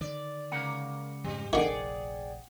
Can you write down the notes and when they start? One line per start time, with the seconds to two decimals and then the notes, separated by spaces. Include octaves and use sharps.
0.01 D3 D#3 D5
0.52 C#2 C#3 A#3 F#5
1.24 F2 G#2 F3 G3
1.53 F1 A#1 D3 D#3 G#4 D5 F#5 G5